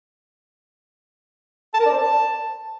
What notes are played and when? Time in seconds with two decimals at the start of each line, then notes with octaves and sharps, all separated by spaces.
1.74 A5
1.80 A#4
1.86 D5
1.92 C5
1.98 A5